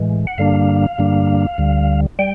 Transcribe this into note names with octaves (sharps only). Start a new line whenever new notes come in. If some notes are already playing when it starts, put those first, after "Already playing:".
Already playing: A2 E3 G#3
F#5
G2 D3 G3 A#3 D4 F5
G2 D3 G3 A#3 D4
D2 D3 G3
G3 G5